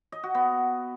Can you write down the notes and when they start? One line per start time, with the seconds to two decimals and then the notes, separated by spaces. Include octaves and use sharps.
0.12 D#5
0.24 F#4
0.35 B3